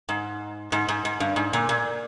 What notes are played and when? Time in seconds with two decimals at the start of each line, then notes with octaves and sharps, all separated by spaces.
0.09 G#2
0.72 G#2
0.89 G#2
1.05 G#2
1.20 G2
1.36 G#2
1.53 A#2
1.69 A#2